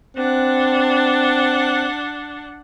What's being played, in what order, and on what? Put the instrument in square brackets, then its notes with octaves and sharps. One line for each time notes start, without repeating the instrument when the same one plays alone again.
[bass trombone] C4 [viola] D4 F#5